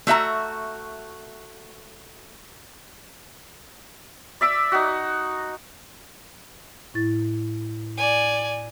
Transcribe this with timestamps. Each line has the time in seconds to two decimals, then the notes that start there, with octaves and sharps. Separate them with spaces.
0.07 A3 F#4 E5 A#5
4.41 D5 E5 D6 E6
4.72 D#4 F#4
6.94 A2 E4 A6
7.98 D5 G#5